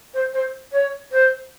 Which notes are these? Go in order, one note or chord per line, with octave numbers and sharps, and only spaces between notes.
C5
C5
C#5
C5